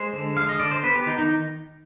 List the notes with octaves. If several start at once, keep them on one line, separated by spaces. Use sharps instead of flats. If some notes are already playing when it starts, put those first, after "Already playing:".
Already playing: G#3 C5
D3
G#3 F5
D#5
D3 D5
C5
B3 B4
G4
D#3 D#4
D#4